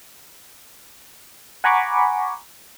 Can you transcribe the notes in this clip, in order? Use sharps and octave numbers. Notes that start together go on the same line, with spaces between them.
F#5 G#5 A#5 B5 C#6 D6